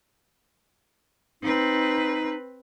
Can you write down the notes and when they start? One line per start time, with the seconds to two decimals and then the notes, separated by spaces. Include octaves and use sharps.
1.42 C4 D#4 B4